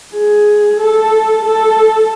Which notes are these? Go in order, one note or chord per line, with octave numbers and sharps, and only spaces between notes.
G#4
A4
A4